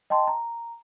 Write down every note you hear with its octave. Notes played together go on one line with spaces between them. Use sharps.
D#5 G5 A5 C6
A#5